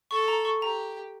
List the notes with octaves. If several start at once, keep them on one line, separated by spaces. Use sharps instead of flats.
A4 C#6
A#5
C#6
G4 A#5